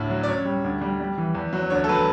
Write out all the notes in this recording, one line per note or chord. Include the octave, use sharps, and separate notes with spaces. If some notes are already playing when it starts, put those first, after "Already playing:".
Already playing: D2 A2
F#3
D5
F#2 C#5
G3
D2
G3
G3
E3
E2
F#3
D2 C#5
A4
F#3 B4